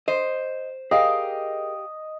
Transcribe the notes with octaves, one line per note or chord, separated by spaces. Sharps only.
C5 D#5
G4 G#4 A#4 D#5 F5 G5